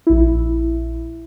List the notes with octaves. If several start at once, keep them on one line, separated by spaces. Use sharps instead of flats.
A#1 E4